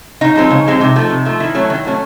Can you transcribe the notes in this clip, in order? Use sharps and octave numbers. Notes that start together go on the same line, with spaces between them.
C#3 D#4
F3 G#3 C4
C#3
F3 G#3 C4
C3 D#4
F3 A3
C3
F3 A3
D#3 E4
F#3 A3 C#4
D#3
F#3 A3 C#4